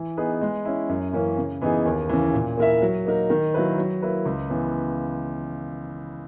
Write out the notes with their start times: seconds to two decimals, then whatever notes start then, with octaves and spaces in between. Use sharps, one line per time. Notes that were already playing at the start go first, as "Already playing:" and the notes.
Already playing: E3
0.17 B3 D#4 G#4 B4
0.41 G#3
0.65 C#4 E4
0.89 F#2
1.13 E3 A#3 C#4
1.37 C#3
1.61 E3 B3 D#4 G#4
1.86 D#2
2.09 C#3 E3
2.34 A#2
2.57 A#3 E4 A#4 E5
2.82 F#3
3.06 A#3 D#4 A#4
3.30 D#3
3.54 F#3 A#3 E4 B4
3.78 F#3
4.02 A#3 E4 B4
4.26 C#2
4.50 C#3 E3 B3